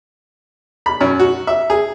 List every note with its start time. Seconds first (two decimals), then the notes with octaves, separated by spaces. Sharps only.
0.86 B5
1.01 F#2
1.20 F#4
1.47 E5
1.70 G#4